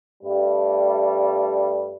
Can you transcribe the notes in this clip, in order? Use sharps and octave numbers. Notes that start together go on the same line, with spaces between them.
G2 G3 A3